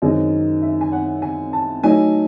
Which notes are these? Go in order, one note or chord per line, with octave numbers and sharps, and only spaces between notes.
F#2 D#3 G#3 C4 D#4
E5
G#5
F#5
G#5
A5
A2 F#3 A3 D#4 G#5